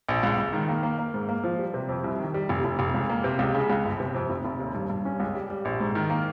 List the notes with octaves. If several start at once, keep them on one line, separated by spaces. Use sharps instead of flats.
A#1
C#2
C#2
D#3
A#3
A#3
A#3
G#2
A#3
F3
G3
C3
F2
C2
D#3
G3
F1
F1
F1
C#2
A#3
C3
C#2
C#3
C#2
G1
C3
F2
F1
F1
D#2
G2
G2
C#4
C#2
G3
G3
A#1
G#2
D#3
A#3